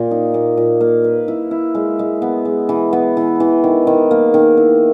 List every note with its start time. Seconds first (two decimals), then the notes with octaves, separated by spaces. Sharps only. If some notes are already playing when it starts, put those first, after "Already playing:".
Already playing: A#2
0.11 D#4
0.34 A#2
0.57 A#2
0.81 A#3
1.04 B4
1.28 E4
1.51 E4
1.75 G#3
1.99 G#3
2.22 B3
2.45 G#3
2.69 E3
2.93 B3
3.17 E3
3.40 E3
3.64 D#3
3.87 D#3
4.11 A#3
4.34 D#3
4.57 E4